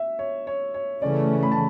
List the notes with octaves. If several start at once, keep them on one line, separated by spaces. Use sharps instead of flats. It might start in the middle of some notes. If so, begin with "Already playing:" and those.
Already playing: E5
C#5
C#5
C#5
C#3 E3 A3 C#4 D5
B5
A5